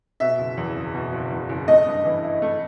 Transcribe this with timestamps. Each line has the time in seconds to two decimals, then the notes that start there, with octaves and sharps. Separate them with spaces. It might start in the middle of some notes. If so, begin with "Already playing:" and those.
0.20 B2 E5
0.39 F#1
0.57 E2
0.75 F#1
0.94 B2
1.12 F#1
1.31 E2
1.49 F#1
1.68 A3 D#5
1.87 G2
2.05 E3
2.23 E4
2.42 A3